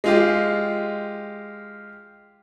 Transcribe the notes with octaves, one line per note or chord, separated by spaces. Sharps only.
G#3 F4 G4